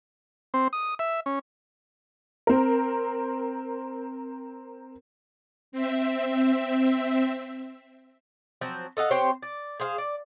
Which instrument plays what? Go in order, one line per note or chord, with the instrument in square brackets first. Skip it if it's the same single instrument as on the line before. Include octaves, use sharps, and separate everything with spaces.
[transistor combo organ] C4
D#6
E5
C#4
[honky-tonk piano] C4 A#4
[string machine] C4 E5
[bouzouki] F3 F#3 C4
A4 D#5 F5 F#5
C4 G4 C5 C#5
D5
G#4 C5 F5
D5